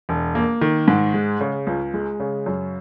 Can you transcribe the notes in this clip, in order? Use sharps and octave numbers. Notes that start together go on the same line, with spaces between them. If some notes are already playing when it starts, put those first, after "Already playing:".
E1
A#3
D#3
G#2
G#3
C#3
C#2
G#3
C#3
F#2